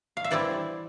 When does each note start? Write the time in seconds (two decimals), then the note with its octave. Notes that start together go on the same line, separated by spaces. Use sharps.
0.17 F5
0.24 E5
0.31 E3 G3 C4 E4 D5